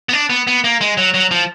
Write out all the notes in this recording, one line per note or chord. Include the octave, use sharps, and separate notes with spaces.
B3
D4
B3
B3
A#3
G#3
F#3
F#3
F3